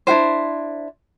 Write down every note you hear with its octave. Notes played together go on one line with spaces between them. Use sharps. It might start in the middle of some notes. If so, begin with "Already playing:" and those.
D4 E4 F#4 C5